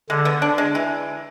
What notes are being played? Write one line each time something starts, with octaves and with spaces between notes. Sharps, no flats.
D3 G#3
B3
D4
G#3
E3